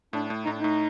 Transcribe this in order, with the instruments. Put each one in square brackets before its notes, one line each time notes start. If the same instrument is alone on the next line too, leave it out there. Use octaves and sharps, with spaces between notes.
[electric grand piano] A2 [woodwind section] D4
[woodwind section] D4
[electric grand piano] A2
[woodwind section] D#4
[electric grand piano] A2 [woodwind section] D4
[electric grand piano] A2 [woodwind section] D#4